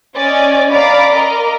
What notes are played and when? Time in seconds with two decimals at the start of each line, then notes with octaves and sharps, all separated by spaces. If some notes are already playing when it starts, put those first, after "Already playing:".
0.16 C#4 D5 D#5
0.72 D5 F5 A#5 B5 D6
1.14 A#4 D5 D#5 A#5